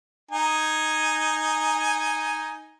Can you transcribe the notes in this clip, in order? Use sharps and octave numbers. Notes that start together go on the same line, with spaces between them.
D#4 G#5